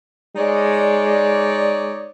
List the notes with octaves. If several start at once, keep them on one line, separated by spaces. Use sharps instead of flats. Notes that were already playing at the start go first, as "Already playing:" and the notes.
G#3 D#4 C#5 D5